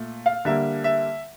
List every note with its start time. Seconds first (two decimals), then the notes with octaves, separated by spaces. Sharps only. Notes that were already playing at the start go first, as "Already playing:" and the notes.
Already playing: A#2 A3
0.26 F5
0.45 D3 G3 A#3 E5
0.84 E5